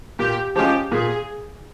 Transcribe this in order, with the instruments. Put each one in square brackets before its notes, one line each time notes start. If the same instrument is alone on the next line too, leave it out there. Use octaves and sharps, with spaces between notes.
[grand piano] A#2 [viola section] G4
[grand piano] F3 G#3 C#4 F4 [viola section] G4
[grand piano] A#2 [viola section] G#4